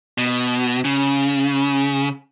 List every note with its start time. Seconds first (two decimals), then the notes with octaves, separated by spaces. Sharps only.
0.18 B2
0.85 C#3